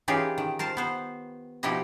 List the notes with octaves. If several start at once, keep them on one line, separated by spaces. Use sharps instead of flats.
E3 C#4 D#4 F4 G4 G#4
D#3
A#4 C5 A5
B3 C5
B2 F3 D#4 E4 G4 D#5